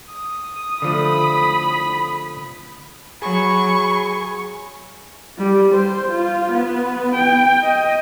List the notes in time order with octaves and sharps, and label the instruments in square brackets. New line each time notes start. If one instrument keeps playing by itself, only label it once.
[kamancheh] D#6
[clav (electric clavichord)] D3 F3 A3 [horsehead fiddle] B5
[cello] F#3 [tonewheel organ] G#4 [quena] B5 [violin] C#6
[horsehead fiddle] G3
C5
F4
B3
G5
D#5